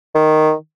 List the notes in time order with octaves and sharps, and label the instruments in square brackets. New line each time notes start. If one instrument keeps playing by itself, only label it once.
[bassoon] D#3